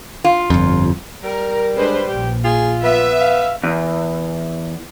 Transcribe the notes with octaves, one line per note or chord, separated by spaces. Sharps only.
F4
G1 F2
G3 A#4
G#3 D4 B4 C5
A#1 G4
F4 G#4
B3 E5
F5
E2